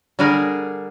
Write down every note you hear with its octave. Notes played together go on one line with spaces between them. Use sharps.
D3 G3 D4 G#4 A#4 G#5